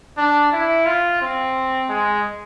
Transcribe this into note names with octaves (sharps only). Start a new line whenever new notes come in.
D4
E4
F4
C4
G#3